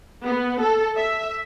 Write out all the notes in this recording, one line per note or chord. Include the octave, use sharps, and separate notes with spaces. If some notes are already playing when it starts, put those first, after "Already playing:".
B3
A4
E5